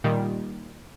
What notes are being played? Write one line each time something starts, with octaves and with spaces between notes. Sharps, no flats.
A#2 D#3 G3